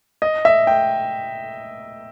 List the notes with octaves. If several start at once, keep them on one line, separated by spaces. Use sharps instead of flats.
D#5
E5
G5